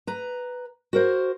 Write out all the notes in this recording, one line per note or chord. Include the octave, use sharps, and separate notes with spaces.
B4 A#5
F#4 A#4 C5